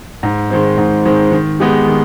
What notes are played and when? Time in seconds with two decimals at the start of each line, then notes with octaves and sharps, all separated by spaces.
0.23 G#2
0.50 D#3 G#3 C4
0.78 G#2
1.05 D#3 G#3 C4
1.32 D#3
1.60 G#3 B3 D#4 G4
1.87 D#3